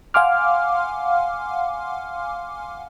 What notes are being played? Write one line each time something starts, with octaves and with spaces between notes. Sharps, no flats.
F5 F#5 G#5 C6 D6 F6